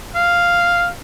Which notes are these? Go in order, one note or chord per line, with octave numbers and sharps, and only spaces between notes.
F5